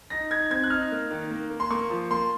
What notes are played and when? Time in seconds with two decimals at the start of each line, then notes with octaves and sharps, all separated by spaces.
0.10 D#4 A#6
0.31 D#4 G#6
0.50 C4 G#6
0.63 F#6
0.70 D#4 F6
0.91 A#3
1.11 D#3
1.31 A#3
1.50 A#3
1.60 C6
1.71 A#3 C#6
1.90 F3
2.11 A#3 C6